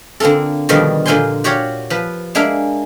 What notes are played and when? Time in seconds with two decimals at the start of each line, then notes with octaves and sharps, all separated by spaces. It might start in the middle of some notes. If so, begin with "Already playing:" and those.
0.20 D3 A#3 C4 F4 A4
0.69 B2 D3 D#3 F3 G3
1.06 A#2 D3 F4 C5 G#5 C6
1.44 F#4 G4 C#5 D5 F5
1.90 F3 B4
2.35 G#3 A#3 D4 E5 F5